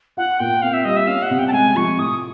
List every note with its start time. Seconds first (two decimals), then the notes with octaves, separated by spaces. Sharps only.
0.17 F4 F#5
0.39 A#2 G5
0.62 C4 F5
0.73 E5
0.84 G3 D#5
0.96 E5
1.07 C#4 F5
1.22 F#5
1.30 C3
1.39 G5
1.48 A5
1.52 G#3 G#5
1.76 F3 C#6
1.98 A2 D#6